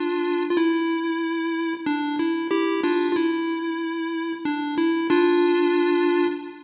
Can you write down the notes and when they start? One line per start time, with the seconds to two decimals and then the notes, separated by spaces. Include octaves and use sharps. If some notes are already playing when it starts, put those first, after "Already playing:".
Already playing: D4 F4
0.51 F4
0.57 E4
1.86 D4
2.19 E4
2.51 E4 G4
2.83 D4 F4
3.12 F4
3.16 E4
4.45 D4
4.78 E4
5.10 D4 F4